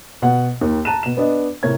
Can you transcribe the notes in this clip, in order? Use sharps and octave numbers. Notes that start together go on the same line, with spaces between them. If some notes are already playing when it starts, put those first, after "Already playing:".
B2 F#5
D#2 D#3
A5 A#5 F#6 D#7 E7
B2 E7
B3 D4 D#5
A2 C3 A#4 C#5 G#6